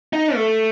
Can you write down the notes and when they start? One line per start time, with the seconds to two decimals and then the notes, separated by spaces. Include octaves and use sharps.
0.13 D#4
0.35 A3